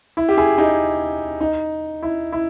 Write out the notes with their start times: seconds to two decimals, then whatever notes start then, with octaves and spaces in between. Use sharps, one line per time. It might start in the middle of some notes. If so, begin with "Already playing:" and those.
0.17 E4
0.29 G4
0.37 E4 G#4
0.58 D#4 G4
1.41 D#4
2.03 E4
2.32 E4